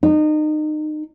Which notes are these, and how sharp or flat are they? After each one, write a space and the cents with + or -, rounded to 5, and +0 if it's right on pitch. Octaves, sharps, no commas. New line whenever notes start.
D#4 -30